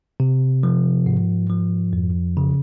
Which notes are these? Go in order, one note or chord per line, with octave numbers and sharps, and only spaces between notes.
C3
F3
G#2
F3
F2
C#3